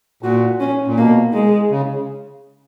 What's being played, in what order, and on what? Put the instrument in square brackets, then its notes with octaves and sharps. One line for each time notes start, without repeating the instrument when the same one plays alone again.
[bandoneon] A#2 [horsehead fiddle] F#4
[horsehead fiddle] C#4
[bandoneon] A#2
[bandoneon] B2 [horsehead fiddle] A#3
[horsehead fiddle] G#3
[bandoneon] C#3